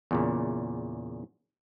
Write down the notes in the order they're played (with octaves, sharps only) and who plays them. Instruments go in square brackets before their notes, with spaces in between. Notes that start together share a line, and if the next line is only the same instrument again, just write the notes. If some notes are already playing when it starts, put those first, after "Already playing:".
[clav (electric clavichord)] E2 A#2 C#3